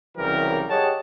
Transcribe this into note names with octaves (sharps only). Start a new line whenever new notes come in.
C2 C#3 E3 F#3 G3 A#4
G4 G#4 C#5 D#5 F#5 A5